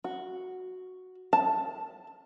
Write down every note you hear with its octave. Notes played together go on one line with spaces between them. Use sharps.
F#4
A5